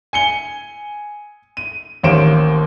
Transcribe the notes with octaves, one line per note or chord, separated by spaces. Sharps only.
G#5 C#7 G7
D#7
A1 D#2 A#3 C5 D7 E7